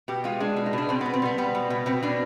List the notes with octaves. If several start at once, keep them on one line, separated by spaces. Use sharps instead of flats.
B2 G4
G#3 F4
G#3 D4
B2
D#4
B2 D4
B2 C4
B2 B3
C4
G3 B3
G3 B3
B2
B2
B2 C4
B2 D4